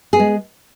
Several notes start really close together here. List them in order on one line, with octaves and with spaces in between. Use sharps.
G#4 B3 G#3